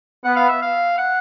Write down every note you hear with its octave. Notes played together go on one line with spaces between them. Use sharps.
B3 F#5
F5
E5
F5
F#5